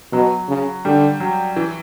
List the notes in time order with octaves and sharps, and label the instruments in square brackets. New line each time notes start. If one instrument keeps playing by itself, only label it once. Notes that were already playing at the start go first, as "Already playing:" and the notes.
[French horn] B2 [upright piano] F#3
[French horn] C#3
[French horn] D3 [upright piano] G3
[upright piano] F#3
E3